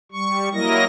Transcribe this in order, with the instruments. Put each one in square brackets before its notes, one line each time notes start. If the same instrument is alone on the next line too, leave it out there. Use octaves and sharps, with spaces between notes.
[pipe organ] G3 C#6
F#3 A#3 E4 A#4 D#5 A#6